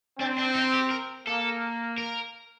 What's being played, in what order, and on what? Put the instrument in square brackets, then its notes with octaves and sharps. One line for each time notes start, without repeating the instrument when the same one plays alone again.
[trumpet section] C4 [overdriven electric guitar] D4
[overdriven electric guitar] D4
D#4
G4
A#4
[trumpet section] A#3 [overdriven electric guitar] A4
[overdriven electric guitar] A#4